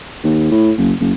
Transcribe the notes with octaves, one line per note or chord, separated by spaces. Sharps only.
D#2
A2
F#1
F#1